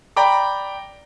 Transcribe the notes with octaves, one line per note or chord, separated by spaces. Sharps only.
D5 G5 A#5 B5 D6